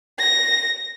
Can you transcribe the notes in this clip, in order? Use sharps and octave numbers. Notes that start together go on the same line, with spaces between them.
A#6